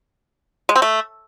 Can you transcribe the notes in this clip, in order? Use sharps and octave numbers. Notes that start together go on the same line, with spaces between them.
G#3
C4
A3